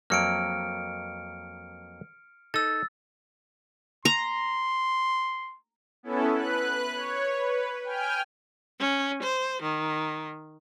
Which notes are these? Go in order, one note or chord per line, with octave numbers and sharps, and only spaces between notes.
F2 F#3 A#3 F6 C#7 D7
D#4 A4 E6 A6
A#5 C6
B3 C#4 E4 A4
B4 F#6
C#5
B4
G5 G#5 F6
C#4
C5
D#3